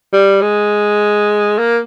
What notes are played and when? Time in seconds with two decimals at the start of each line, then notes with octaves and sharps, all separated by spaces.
0.13 G3
0.42 G#3
1.58 A#3